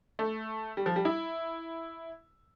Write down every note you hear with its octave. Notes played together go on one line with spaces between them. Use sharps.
A3
G3
F3
G3
E4